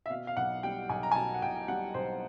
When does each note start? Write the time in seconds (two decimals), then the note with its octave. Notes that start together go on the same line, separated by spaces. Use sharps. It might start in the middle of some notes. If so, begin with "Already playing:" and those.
0.06 E5
0.10 B2 F5
0.27 F5
0.37 B1 F#5
0.63 G3 G5
0.89 B1 G#5
1.03 A#5
1.12 G#5
1.15 B2 A5
1.34 F#5
1.42 B1 G5
1.68 G3 F#5
1.94 B1 C5